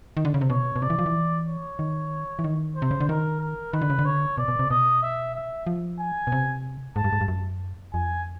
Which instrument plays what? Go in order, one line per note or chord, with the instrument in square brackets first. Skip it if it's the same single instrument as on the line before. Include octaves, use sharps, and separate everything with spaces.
[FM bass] D#3
D3
C#3
C3
[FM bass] B2 [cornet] C#5
[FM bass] B2
[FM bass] C3 [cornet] D5
[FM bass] E3
F3
E3
[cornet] C#5
[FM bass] D#3
E3
D#3
[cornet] C5
[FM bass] C3
C#3
D3
[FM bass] D#3 [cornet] A#4
[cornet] A#4
[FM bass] D#3 [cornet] B4
[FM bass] D3
C#3
D3
[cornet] C#5
[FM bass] B2 [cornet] D5
[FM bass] B2
C3
[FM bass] B2 [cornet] D#5
[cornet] E5
E5
[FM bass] F3
[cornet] G#5
[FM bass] B2
C3
[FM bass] G#2 [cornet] A5
[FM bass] G2
G#2
G2
F#2
[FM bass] F2 [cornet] G#5